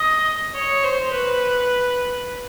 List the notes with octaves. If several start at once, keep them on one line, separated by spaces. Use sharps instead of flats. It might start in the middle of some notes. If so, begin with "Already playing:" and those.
Already playing: D#5
C#5
C5
B4